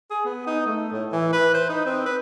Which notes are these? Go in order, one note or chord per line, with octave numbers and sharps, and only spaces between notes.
G#4
B3
D#4
A3
A2
E3
B4
C5
D#4
C4
B4